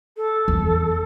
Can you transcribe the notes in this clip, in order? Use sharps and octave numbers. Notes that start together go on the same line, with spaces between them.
A4
E2